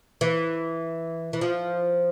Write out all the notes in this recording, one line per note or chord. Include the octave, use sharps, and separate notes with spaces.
E3
E3
F3